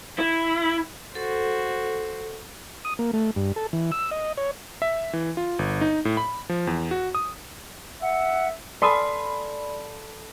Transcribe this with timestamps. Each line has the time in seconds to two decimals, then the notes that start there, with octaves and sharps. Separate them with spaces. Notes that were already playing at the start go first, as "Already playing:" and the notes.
0.19 E4
1.15 F#4 A4 C5
2.85 D#6
2.99 A#3
3.13 A3
3.36 G2
3.56 A4
3.73 E3
3.92 E6
4.11 D#5
4.37 C#5
4.82 E5
5.13 E3
5.37 F4
5.59 G1
5.81 D#4
6.05 A2
6.17 B5
6.49 F3
6.67 E2
6.91 F#4
7.15 D#6
8.02 E5 F#5
8.82 A4 D5 B5 C6 D#6